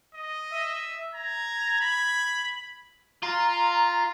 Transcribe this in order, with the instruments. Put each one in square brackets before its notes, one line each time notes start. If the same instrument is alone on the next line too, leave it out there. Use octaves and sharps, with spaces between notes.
[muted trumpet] D#5
[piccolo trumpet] E5
[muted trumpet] A#5 [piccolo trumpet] G#6
[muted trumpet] B5
[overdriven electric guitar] F4 [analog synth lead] A#5